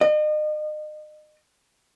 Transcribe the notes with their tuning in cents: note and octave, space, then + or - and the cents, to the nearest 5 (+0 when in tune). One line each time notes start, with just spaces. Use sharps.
D#5 -35